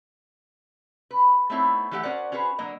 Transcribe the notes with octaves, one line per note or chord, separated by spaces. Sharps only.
B4
A3 B3 C4 D#4 E4 C#5
E3 F#3 A3 G4 C#5 F#5
C#4 F#4 A#4 C5 D5 F#5
C#4 F#4 G#4 B4 C5
D3 F#3 A#3 A#4 D#5